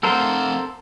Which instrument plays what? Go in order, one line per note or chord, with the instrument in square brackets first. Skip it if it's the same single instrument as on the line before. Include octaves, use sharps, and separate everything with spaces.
[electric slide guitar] C4 F5 F#5 [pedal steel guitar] A4 A#4 C5